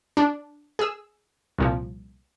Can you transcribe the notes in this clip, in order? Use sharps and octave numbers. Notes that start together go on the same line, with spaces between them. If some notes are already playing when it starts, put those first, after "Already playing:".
D4
G#4 E6
C2 A#2 F3